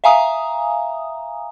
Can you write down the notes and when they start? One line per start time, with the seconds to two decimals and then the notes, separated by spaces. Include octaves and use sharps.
0.04 E5 F5 G#5 A#5 D#6